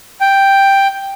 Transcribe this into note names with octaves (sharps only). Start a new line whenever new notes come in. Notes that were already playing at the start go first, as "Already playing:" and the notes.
G5